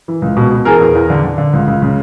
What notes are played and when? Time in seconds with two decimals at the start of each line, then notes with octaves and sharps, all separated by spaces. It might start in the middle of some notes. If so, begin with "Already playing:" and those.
0.08 E3
0.22 C#2
0.37 B2
0.51 B2
0.65 E3 G#4 A#4
0.81 E2
0.95 E2
1.10 D3
1.24 D3
1.38 D3
1.53 C#2
1.67 C#2
1.82 C#3